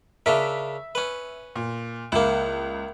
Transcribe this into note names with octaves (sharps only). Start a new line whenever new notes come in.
C#3 D4 A#4 E5 B6
C#4 B4
A#2
C#2 A#3 E4